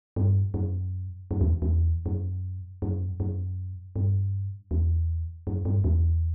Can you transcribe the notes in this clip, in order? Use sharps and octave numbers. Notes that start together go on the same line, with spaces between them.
G2
F#2
F#2
E2
E2
F#2
F#2
F#2
G2
E2
F#2
G2
E2